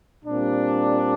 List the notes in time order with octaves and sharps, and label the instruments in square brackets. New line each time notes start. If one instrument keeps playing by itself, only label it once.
[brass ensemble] A#2 G3 C4 D4